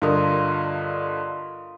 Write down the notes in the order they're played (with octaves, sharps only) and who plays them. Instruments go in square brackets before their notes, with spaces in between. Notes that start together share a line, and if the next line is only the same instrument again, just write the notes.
[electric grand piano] G2 D3 [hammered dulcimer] F4 A#4 D#5